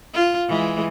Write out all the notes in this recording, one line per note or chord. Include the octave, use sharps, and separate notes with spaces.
F4
E3 G#3